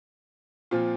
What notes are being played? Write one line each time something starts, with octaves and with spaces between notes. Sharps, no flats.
A#2 F3 C4 F4